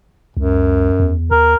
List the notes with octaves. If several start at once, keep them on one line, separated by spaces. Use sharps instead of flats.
C#2 F#2
E2
D#2 A#4